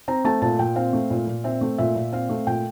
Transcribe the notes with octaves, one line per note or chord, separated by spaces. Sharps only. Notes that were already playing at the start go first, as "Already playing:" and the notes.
C4 A#5
A3 A5
A#2 A5
A#2 G5
C4 F5
A3
A#2
A#2
C4 E5
A3
A#2 E5
A#2
C4 F5
A3
A#2 G5